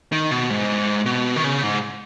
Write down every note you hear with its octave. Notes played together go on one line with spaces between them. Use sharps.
D#3
B2
G#2
B2
D#3
C#3
G#2